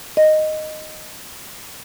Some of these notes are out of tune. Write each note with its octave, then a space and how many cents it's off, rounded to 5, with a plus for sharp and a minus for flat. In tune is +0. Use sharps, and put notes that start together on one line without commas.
D#5 -5